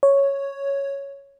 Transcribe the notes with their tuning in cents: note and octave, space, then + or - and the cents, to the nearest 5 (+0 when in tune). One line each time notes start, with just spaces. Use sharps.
C#5 +0